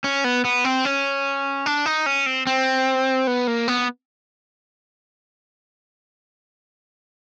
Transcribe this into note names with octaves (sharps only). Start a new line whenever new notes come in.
C#4
B3
B3
C4
C#4
D4
D#4
C#4
C4
C4
B3
A#3
B3